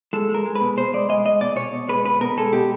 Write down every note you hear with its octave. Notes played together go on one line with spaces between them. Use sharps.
G#3 A4
G#3
A#4
G#3
B4
B2
B2 C5
G#3 D5
G#3 D#5
G#3 D#5
B2 D5
B2 C#5
B2
G#3 B4
B2 B4
B2 A#4
G#3 A4
B2 G4